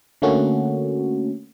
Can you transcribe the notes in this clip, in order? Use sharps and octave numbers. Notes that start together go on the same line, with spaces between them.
D3 A3 A#3 C#4 F#4